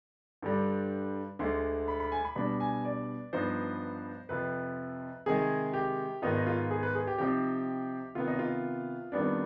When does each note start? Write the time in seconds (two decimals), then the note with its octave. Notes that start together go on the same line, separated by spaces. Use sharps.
0.42 G2 D3 G3
1.39 D2 D3 G#3 C6
1.88 B5
2.00 B5
2.12 G#5
2.25 B5
2.35 B2 G3 D4 B5
2.60 G#5
2.85 D5
3.33 G2 F3 B3 D#4 C5
4.29 F2 C3 F3 B4
5.26 C3 D#3 G#3 G#4
5.74 G4
6.22 G#2 D#3 B3 D#4 F4
6.35 D#4
6.47 F4
6.71 G#4
6.83 B4
6.95 G#4
7.07 G4
7.18 C3 F3 C4 D#4 G4
8.15 C3 D#3 B3 F4
8.28 D#4
8.39 F4
9.12 F2 D#3 G3 B3 D4